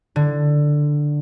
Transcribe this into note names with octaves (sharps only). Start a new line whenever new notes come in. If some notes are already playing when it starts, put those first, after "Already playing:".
D3